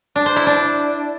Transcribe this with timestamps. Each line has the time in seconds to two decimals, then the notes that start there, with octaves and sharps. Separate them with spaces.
0.16 D4
0.26 C5
0.36 E4
0.47 D4